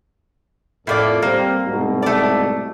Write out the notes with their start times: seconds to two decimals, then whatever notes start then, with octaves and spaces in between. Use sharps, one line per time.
0.87 F2 A2 A#3 A4 D5
1.22 G3 A#3 C4
1.65 C2 G#2 B2
2.02 A3 D5